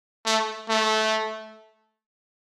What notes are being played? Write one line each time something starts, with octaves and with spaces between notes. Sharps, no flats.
A3
A3